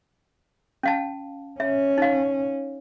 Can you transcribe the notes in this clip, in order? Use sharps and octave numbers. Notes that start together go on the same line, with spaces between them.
C#4 F5 A5
C#4 E5
D#4 F5